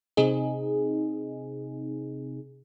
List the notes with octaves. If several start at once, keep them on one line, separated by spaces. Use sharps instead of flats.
C3 C4 D#4 G#4